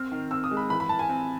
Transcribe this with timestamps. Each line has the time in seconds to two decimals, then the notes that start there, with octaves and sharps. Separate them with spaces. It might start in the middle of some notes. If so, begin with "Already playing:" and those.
Already playing: C4 F6
0.12 D#3
0.31 C4 E6
0.44 D#6
0.51 G#3
0.57 B5
0.70 E3 B5
0.80 B5
0.89 E3 A5
0.99 G#5
1.09 C4